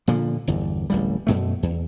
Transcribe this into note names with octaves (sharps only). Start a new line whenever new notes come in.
A#2 D3 F3
G1 E2
D1 A1 G3
F#2 B2 A3
E2